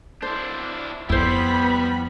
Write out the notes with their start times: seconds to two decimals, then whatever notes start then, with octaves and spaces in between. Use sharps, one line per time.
0.22 D4 E4 C5
1.09 F2 G3 B3 E4 C5 B5